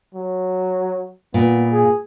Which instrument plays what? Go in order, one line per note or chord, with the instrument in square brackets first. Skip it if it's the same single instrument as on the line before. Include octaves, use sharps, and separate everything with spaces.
[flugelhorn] F#3
[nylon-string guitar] A#2 [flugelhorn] B3
[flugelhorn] G#4